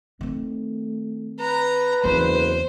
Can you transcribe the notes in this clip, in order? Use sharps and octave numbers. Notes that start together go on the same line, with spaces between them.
D#3 A3 C4
B4 A#5
F#1 E2 C4 C5